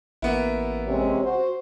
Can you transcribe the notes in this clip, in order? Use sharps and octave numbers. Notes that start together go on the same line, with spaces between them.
A1 A#3 B3 E4
C3 G#3 C#4 C#5
F#4 C5